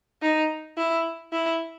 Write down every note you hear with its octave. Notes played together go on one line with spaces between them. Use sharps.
D#4
E4
E4